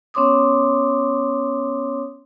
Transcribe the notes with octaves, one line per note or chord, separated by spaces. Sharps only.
B3 C#4 C#5 C6 D6 D#6